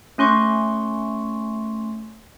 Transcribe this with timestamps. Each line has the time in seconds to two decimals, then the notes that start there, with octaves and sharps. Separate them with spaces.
0.18 A3 C#4 C6 C#6